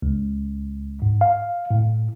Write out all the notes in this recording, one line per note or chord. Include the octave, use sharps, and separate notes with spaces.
C#2
G#2
F5
A2